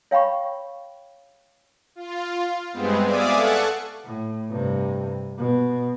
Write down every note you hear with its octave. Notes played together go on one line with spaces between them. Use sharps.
C#5 F5 G5 B5 C#6
F4
G2 G#3 B3 C4
D5 E5 F5 G#5 D6 D#6
A4 F#5 C#6 F#6
A2
G2 C3
B2